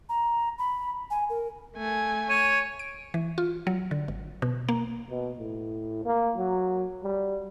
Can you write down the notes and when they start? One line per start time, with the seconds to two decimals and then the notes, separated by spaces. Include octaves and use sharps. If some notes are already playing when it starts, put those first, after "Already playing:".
0.09 A#5
0.58 B5
1.10 G#5
1.30 A#4
1.76 A3 G#5
2.29 C#5 D#7
2.79 D7
3.14 E3
3.38 F4
3.67 F#3
3.91 D3
4.08 G#1
4.42 B2
4.69 A#3
5.10 B2
5.39 A2
6.05 A#3
6.37 F#3
7.04 G3